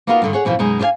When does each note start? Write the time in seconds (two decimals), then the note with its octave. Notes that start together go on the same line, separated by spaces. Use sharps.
0.07 A#3 B3 D#4 F4 F#4 A#4
0.22 G2 D3 D#3
0.33 G#4 C#5 F#5
0.45 F#2 B2 E3 F3
0.59 F#2 B2 G#3 D#4
0.79 D4 G#4 C5 F5 G#5